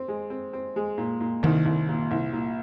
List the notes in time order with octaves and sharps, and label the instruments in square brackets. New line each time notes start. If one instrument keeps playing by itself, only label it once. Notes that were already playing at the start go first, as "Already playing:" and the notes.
Already playing: [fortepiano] C4
G#3
C4
C4
G#3
A#2
A#2
[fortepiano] C2 [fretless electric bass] D#3
[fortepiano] C2
A#2
C2
A#2